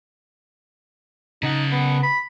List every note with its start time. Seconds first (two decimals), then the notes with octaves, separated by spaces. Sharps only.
1.43 C#3 D#4 F#5
1.71 B3
2.03 B5